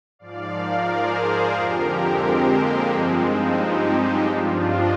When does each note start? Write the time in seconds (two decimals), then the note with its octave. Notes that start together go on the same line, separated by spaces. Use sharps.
0.19 G#2 F3 D5 F5
0.53 A#4 D5
0.87 G#4 C5
1.54 F2 D3 F3 G4 A#4
1.88 G#3 C4
2.23 G#3
2.56 A#3
2.89 G2 F3 G#3 C4
3.23 C4 D#4
3.57 D#4 G4
3.91 D#4 G4
4.24 G2 F3 D4 F4
4.59 C5 D#5